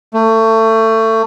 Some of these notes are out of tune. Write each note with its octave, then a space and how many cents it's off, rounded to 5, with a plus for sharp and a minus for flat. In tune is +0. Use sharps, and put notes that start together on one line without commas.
A3 +25